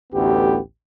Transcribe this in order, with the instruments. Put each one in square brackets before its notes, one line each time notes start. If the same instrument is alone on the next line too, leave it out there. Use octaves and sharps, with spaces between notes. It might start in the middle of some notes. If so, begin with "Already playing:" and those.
[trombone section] A1 D2 B3 G4